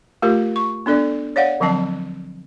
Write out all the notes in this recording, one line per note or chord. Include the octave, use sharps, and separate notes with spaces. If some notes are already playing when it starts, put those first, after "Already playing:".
A3 F4 G4 A#4
C#6
B3 D4 A4 D5
C#5 D5 F5 F#5
D3 F3 F#3 C4 D#5 A5